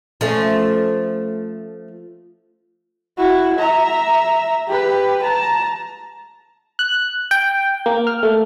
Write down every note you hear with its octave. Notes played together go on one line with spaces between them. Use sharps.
F3 A3 C#4
E4 F#4
E5 A#5
G4 B4
A5 A#5
F#6
G5
A#3
F6
A3